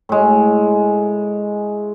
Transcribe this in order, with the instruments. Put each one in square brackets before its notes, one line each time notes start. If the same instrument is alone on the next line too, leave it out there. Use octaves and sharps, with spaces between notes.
[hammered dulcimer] A2 G#3